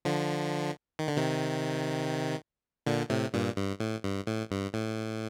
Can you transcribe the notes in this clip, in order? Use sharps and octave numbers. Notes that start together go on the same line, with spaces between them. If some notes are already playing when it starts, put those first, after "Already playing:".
D3 F3
D#3
D3
C3 D#3
A#2 D3
A2 C3
G2 A#2
G2
A2
G2
A2
G2
A2